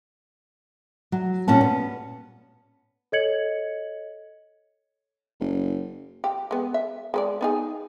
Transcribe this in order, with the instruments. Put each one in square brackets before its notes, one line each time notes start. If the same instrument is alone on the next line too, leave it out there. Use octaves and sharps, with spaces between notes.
[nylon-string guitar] F#3
A#2 G3 C#4 F#5 A5
B3
[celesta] A4 C#5 D#5 G#6 C#7 F#7
[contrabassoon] F#1
[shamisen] G4
G#3 B3
E5
G#3 B4 D5
B3 D#4 G#4